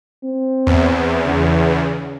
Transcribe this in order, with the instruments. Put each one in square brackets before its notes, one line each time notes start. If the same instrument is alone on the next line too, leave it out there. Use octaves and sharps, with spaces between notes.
[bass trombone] C4
[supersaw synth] E2
[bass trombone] C#3